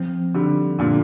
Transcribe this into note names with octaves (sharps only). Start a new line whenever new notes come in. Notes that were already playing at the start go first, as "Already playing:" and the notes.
Already playing: F3 C4
D3 G3
A#2 D3